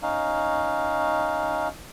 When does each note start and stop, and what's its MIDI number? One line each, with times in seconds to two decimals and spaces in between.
0.03 1.68 61
0.03 1.68 63
0.03 1.68 77